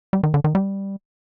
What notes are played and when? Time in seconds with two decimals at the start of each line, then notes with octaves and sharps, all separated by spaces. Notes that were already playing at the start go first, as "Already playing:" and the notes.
0.13 G3
0.23 D#3
0.34 D3
0.44 D#3
0.55 G3